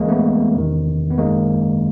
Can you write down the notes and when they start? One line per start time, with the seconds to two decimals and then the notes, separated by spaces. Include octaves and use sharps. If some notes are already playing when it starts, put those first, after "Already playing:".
Already playing: D2 C#3 E3 G#3 A#3
0.08 A3 B3
0.56 E2 C3 D#3
1.10 B3
1.18 G#1 F#2 D#3 G#3 A#3